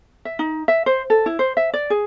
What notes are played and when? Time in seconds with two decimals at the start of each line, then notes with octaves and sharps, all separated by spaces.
0.25 E5
0.39 D#4
0.68 E5
0.86 C5
1.10 A4
1.26 E4
1.39 C5
1.57 E5
1.74 D5
1.90 G#4